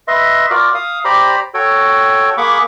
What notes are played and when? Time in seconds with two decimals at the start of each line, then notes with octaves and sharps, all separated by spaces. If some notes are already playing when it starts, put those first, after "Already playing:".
0.08 B4 D#5 E5 C6
0.50 F4 F#4 A#4 D5
0.74 F5 D#6
1.05 G4 C5 D5 A#5 B5
1.54 F#4 A4 C#5 G5
2.37 A#3 G#4 F#5 B5 C#6 D6